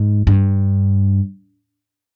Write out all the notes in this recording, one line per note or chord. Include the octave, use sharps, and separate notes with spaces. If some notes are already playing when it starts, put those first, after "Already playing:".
Already playing: G#2
G2